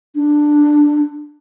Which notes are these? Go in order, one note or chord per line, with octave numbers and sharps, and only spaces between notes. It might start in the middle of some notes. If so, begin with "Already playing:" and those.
D4